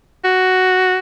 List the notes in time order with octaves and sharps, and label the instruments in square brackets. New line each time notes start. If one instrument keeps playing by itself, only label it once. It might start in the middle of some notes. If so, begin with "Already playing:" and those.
[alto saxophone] F#4